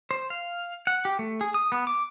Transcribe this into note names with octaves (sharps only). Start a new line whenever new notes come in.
C5
F5
F#5
G4
A3
G#4
D#6
B3
D6